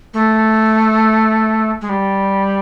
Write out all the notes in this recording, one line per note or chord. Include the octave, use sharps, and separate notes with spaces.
A3
G#3
G3